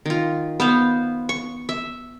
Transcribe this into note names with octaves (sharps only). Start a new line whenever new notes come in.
D#3 F4
B3 C5 F5
C#6
E5